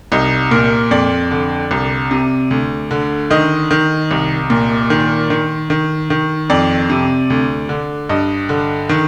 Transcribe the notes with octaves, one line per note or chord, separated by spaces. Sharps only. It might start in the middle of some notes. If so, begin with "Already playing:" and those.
C2 D#4
A#2 A#4
F2 D5
D3
C2
C3
D2
D3
D#3 D#5
D#3
C2
A#2
D#3
D#3
D#3
D#3
F2 D5
C3
D2
D3
G2 D#5
D3
D#3